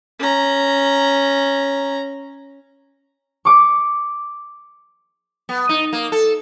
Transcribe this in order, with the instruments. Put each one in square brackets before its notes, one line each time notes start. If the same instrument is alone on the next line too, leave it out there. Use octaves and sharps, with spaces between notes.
[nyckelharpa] C#4 A#5
[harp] C#6 D6
[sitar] B3
D#4
A#3
A4